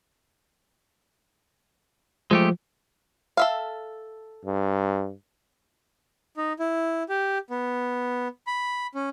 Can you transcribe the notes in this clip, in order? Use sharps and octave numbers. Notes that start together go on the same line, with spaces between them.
F3 G#3 A3 G4
A4 E5 F5
G2
D#4
E4
G4
B3
B5
C#4